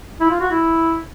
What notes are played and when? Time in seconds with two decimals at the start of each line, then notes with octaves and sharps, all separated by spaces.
0.20 E4
0.31 F4
0.41 F#4
0.51 E4